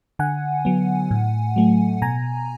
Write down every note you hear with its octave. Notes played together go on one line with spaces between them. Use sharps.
D3 F#5 G#5
F#3 B3
A2
F#3 A3
B2 G#5 A#5